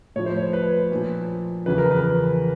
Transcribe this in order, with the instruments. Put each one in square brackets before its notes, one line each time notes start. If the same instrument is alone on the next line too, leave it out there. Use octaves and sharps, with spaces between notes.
[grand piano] A2 F3 C#5
C5
C#5
B4
A#2 F3
E2 C#3 F3 B4
A#4
B4